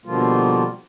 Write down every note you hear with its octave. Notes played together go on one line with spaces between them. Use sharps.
B2 D3 F3 G3 A#3 F4